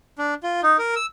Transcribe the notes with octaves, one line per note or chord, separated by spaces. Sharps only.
D4
F4
D#4
A#4
E6